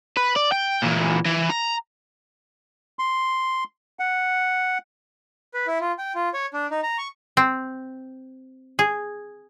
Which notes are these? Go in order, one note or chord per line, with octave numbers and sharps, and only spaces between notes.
B4
D5
G5
A#2 E3
E3
A#5
C6
F#5
B4
E4
F4
G5
F4
C#5
D4
D#4
A#5
C#6
C4
G#4